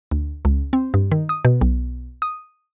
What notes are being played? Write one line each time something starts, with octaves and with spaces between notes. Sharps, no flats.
D2
C#2
C4
G2
D#3
D#6
B2
B1
D#6